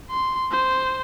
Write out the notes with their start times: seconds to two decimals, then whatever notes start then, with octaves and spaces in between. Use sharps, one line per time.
0.10 C6
0.52 C5